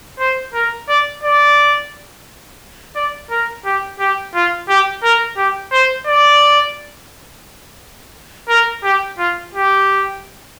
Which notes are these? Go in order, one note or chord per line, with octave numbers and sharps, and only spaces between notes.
C5
A#4
D5
D5
D5
A#4
G4
G4
F4
G4
A#4
G4
C5
D5
A#4
G4
F4
G4